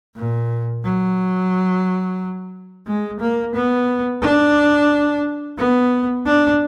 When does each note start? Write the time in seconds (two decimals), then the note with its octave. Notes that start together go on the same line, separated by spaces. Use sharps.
0.16 A#2
0.84 F#3
2.87 G#3
3.20 A#3
3.55 B3
4.22 D4
5.58 B3
6.26 D4